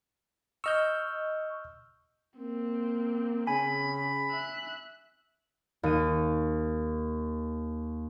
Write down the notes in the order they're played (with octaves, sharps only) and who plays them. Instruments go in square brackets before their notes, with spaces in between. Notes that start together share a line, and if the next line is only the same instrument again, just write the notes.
[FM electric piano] D#5 C#6 [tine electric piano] E6 F6 G6
[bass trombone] A#3 [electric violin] C4
[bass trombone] C#3 [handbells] G#5 [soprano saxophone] B5
[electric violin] E5 F#6
[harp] D#2 D#7